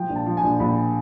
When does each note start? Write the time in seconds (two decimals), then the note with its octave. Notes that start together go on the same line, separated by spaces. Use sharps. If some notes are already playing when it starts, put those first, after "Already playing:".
Already playing: F3 G5
0.09 A#1
0.16 A5
0.26 F3
0.37 G#5
0.43 A#1
0.59 A#1 B5